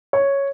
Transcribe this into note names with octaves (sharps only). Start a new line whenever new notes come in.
C#5